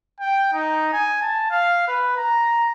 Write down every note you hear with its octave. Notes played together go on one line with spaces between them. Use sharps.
G5
D#4
G#5
A5
F5
B4
A#5